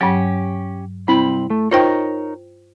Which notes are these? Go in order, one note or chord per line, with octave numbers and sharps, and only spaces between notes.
G2 F#3 C#4 G4
C2 C4 E4 B5
A3
D#4 F4 A#4 C5 C#5 G5